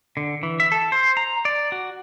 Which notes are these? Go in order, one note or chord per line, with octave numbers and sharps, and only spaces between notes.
D3
E3
E5
A4
C5
A#5
D5
F#4